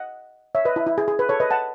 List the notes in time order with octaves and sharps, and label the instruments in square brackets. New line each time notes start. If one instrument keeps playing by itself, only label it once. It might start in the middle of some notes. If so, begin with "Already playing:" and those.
Already playing: [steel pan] D#5 F#5
C#5 E5
B4 D#5
E4
E4
G#4
G#4
B4
A4 C#5
B4 D#5
F#5 A5